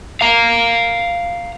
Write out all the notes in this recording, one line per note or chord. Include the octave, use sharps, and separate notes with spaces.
F5 A#5